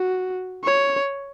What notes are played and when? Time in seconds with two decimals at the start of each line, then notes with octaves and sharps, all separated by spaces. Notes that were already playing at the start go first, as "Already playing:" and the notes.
Already playing: F#4
0.64 C#5